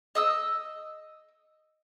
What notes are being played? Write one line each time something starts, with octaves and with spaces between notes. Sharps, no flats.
D#5 D#6 E6